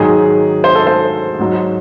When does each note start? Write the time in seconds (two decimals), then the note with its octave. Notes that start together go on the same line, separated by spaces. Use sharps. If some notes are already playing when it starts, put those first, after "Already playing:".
Already playing: G#2 D#3 F#3 G#4
0.64 C5
0.75 A4
0.87 C5
1.39 G#2 F#3